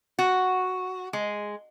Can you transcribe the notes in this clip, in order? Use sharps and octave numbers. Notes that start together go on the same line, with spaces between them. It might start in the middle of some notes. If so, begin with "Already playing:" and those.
F#4
G#3